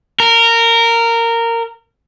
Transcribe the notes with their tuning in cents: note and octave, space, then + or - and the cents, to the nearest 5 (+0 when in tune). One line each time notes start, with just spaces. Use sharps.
A#4 -15